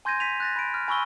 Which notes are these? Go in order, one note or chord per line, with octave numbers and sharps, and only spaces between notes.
G#5 C6 G6 G#6 A#6 D#7
B6 D#7 F7
F#6 A6 A#6
B5 D7
F6
G#5 B5 C#6 E6 G7